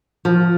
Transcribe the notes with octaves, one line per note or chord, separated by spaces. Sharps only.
F3